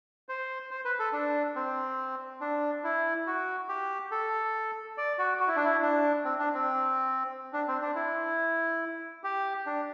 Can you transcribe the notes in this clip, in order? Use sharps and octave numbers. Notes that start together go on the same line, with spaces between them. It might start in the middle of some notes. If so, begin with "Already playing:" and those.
C5
C5
B4
A4
D4
C4
D4
E4
F#4
G4
A4
D5
F#4
F#4
E4
D4
E4
D4
C4
D4
C4
D4
C4
D4
E4
G4
D4